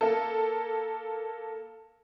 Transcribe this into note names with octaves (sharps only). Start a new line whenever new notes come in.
A#3 A4